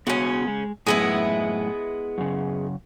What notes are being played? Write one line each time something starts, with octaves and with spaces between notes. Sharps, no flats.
C#3 B3 C#4 F#4 G#4
G#3
F#2 A2 G#3 B3 E4
F#2 C#3